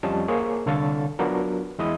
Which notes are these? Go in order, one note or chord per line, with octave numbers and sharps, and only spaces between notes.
F2 F3 G3 C#4 D#5 A5
A#3 G#4 C5 C#5
C2 D3 A4 C#5 F5 A6
F#3 B3 D4 F4 A#4
E2 G#3 E4 D#5 D#6